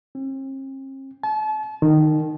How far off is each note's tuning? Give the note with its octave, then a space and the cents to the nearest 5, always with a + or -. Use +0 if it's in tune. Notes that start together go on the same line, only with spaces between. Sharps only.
C4 +45
A5 -35
D#3 -15